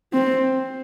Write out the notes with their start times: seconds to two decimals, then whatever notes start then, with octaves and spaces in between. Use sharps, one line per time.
0.13 C4